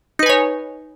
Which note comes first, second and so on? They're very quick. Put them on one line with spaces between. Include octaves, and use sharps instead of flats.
D#4 B4 G#5 C#5